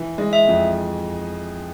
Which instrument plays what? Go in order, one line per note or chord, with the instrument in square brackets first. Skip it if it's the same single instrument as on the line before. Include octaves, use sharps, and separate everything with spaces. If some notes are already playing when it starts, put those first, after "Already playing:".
Already playing: [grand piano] E3
G#3
[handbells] E5
[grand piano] F2